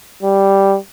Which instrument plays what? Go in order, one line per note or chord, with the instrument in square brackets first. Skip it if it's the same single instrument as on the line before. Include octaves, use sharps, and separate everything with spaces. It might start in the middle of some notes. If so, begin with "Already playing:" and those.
[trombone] G3